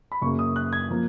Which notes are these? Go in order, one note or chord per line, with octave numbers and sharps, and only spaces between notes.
B5
F#2 C#3 F#3 A#3 C#6
D#6
F#6
G#6
F3 A#3